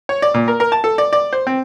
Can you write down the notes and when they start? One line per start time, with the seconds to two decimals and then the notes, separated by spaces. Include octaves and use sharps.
0.09 C#5
0.22 D5
0.34 A#2
0.48 A#4
0.60 A#4
0.72 A5
0.84 A4
0.98 D5
1.13 D5
1.33 C5
1.47 C4